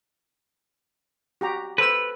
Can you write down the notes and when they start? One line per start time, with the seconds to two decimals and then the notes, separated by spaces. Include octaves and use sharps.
1.41 F#4 G4 A#5
1.78 A4 B4 C5 E6